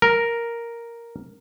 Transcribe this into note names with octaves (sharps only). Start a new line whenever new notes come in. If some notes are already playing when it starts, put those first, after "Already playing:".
A#4